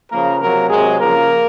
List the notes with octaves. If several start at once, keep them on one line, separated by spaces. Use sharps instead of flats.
C#3 F3 A#3 A#4
C3 F#3 A#3 A#4
C3 F#3 G#3 G#4
C#3 F3 A#3 A#4